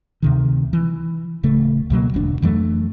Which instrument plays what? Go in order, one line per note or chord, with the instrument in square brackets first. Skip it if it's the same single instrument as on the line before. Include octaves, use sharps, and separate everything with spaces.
[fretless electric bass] D2 C3 D#3
E3
D1 C#3 A3
C#2 B2 F#3 A#3
E1 D2 C4 D4
F2 E3 F#3 A3